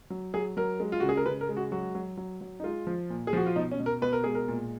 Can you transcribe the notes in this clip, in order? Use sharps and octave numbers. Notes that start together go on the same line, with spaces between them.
F#3
F#3 G#4
F#3 A#4
G#3
F4
C#3 F#4
G#4
A#4
C#3 B4
A#4
G#3
F#4
F#3 F#4
F#3
F#3
F#3
D#4
G#3 F4
F3
A#2
G#4
F3 F#4
F4
B2 D#4
C#4
B2
A#4
B2 B4
A#4
G#3 G#4
A#4
A#2